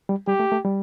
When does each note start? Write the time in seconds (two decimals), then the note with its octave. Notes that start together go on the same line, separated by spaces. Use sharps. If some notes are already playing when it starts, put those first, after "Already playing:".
0.09 G3
0.28 G3 G4
0.40 A3
0.52 A3
0.65 G3